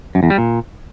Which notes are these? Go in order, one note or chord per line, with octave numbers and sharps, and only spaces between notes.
F#2
E2
G3
A#2